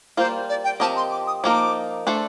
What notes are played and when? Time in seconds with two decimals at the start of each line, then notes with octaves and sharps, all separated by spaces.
0.17 G3 A#3 F4 A#4 C5
0.49 D5
0.64 G5
0.80 F3 C4 G4 A#4 D#5 A5
0.97 C6
1.11 D6
1.27 D#6
1.44 F3 A#3 D#4 A#4 D6
2.07 A3 D4 A4 C5